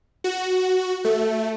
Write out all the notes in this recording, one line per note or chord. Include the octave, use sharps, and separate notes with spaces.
F#4
A3